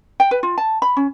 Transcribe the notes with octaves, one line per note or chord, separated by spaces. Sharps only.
G5
B4
F4
A5
B5
C#4